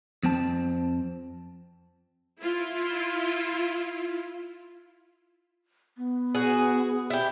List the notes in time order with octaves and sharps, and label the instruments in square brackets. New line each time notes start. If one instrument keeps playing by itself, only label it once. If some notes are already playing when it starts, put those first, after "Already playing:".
[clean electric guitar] F2 C4 A5
[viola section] E4 F4
[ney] B3
[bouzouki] F#4 G#4
E4 G4